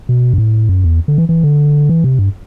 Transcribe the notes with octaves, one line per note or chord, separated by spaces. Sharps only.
B2
G2
A2
F#2
E2
D3
E3
E3
D3
E3
C3
G2